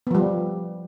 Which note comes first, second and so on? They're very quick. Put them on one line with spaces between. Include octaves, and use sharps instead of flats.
B3 F3 G3